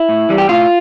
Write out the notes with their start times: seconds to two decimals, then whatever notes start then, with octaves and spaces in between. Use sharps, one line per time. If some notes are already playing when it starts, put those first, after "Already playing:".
Already playing: E4
0.09 A2
0.29 E3 G3
0.38 G4
0.49 A2 F4